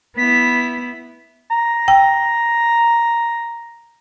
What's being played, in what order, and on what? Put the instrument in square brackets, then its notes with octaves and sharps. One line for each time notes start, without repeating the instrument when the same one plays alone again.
[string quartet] B3 E4 [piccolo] B6
[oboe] A#5
[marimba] G5